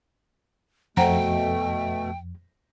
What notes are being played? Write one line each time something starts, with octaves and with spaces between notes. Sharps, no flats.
F2 B2 A3 C5 F#5 G5 A#5